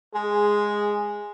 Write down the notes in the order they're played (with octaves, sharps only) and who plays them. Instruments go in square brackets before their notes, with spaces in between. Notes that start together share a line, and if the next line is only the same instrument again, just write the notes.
[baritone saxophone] G#3 [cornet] G#4